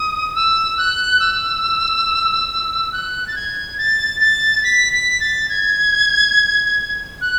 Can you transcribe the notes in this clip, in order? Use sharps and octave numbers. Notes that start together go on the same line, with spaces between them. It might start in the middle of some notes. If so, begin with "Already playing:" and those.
Already playing: D#6
E6
F#6
E6
F#6
A6
G#6
A6
A6
B6
B6
A6
G#6
F#6